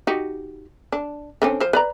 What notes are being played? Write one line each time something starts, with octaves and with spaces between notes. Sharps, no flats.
D#4 F#4 G4
D4
D3 C4 C#4
F3 C5
B4 D5 A#5